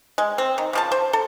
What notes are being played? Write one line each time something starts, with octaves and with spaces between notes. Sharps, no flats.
G#3
C4
D#3
C#3 F3 A5
C5
A4